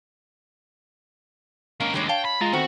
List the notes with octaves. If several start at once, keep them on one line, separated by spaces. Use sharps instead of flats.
G#3 A#3 C#4 A#4
D#2 G3 G#3 D4 C#5
C#5 F5 G5 A5
B5
G#3 F4 A#5 A6
D#3 A3 B3 C4 F#4